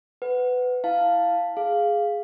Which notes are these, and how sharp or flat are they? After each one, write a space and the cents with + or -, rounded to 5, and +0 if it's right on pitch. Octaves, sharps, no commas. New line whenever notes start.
B4 +20 F#5 +0
E4 +0 F5 +0 A5 +5
G#4 +0 F5 +0